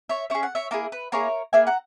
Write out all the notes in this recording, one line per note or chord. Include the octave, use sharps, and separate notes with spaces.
C#5 E5
C#4 G#4 E5
F#5
C#5 E5
A#3 E4 G#4 A#4
B4
A#3 E4 G#4 A#4 C#5
A#3 E4 G#4 E5 G#5
F#5 A#5